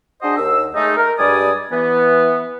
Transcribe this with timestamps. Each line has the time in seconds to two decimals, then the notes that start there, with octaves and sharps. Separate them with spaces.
0.22 D4 F#4 G#4 C5 D#5
0.37 D#2 E6
0.75 G#3 A3 D#4
0.97 A#4
1.18 G2 G3 G#3 D5 G#5 D#6
1.71 E3 B3